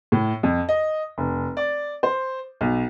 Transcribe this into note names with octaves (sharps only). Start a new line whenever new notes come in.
A2
F2
D#5
F1
D5
C5
B1